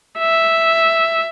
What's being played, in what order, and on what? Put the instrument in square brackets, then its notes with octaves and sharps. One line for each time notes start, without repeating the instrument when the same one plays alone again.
[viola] E5